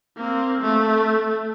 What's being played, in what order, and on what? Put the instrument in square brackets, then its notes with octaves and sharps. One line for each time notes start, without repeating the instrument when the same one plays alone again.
[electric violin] A#3 C4
A3